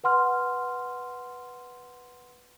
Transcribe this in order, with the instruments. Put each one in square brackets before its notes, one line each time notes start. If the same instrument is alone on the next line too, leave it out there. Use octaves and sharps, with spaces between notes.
[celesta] B4 F#5 C6 F6